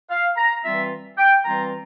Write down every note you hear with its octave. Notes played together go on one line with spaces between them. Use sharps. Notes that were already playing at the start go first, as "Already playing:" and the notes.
F5
A#5
E3 G3 C4 F4 E5
G5
E3 G3 C4 F4 A#5